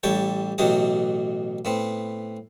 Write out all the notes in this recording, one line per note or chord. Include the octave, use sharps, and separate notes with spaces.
A1 G3 A4 C#5 G5
A1 B2 F#3 A3 G4 D#5
A2 B3 C4